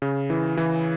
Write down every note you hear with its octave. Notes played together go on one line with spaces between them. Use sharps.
C#3
E3
E3